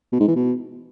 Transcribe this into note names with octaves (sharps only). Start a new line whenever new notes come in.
B2
G#2
E3
B2